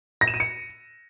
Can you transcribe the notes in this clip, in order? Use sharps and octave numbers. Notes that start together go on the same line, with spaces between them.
A#6
E7
D#7
C#7